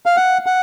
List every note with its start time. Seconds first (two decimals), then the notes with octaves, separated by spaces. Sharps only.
0.06 F5
0.17 F#5
0.46 F#5